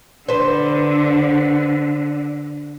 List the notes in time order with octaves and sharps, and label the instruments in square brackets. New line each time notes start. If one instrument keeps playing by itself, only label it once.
[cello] D3 [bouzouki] B4 C5